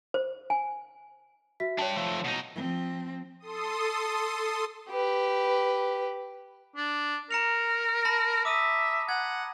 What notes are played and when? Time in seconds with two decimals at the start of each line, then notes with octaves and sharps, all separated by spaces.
0.14 C5
0.50 G#5
1.60 F#4 E5 B6
1.79 D4 C#5 G5 A5
1.97 F3 A3
2.25 B2 D#4
2.55 F3 C4
3.40 A4 C6 D#6
4.90 G4 B4
6.76 D4
7.31 A#4 A#5 C#7 F7
8.05 A5 B5 A#6
8.45 E5 D6 D#6 D#7
9.09 F#5 G#6